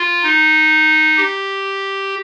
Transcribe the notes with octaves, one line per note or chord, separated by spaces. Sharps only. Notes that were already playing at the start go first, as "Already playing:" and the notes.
Already playing: F4
D#4
G4